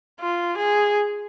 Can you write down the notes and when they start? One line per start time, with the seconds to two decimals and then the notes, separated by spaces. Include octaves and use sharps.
0.20 F4
0.57 G#4